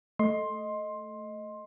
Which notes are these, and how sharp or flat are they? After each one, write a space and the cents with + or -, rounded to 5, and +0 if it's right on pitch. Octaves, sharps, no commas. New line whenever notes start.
A3 +0 D#5 +5 C6 +15